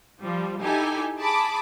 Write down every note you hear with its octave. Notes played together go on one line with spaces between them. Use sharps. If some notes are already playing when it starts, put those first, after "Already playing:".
F3 G3
D#4 E4 G4 A4 G#5
G#4 A5 B5 D6